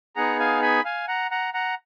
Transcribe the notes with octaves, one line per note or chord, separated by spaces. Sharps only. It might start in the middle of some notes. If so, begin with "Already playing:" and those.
B3 D#4 G#4 F#5 A#5
F5 G#5
G#5 B5
F5 G#5
F#5 A#5
F#5 A#5
F#5 A#5